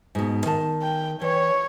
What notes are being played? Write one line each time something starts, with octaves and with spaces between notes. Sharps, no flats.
G#2 B2
D#3 A5
G5
E3 C#5